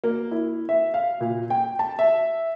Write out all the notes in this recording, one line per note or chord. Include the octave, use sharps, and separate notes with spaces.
A#3
E4
E5
F5
A#2
G5
A5
E5